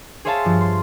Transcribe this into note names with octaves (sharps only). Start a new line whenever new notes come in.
G#4 C5 C#5 E5 F5 A5
G2 F3
C6